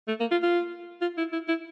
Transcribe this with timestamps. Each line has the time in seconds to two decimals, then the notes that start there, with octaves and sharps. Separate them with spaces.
0.08 A3
0.20 A#3
0.31 F4
0.43 F4
1.01 F4
1.18 E4
1.32 E4
1.48 E4